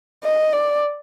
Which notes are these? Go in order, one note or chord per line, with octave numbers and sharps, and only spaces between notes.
D#5
D5